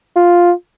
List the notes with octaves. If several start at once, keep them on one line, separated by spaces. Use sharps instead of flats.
F4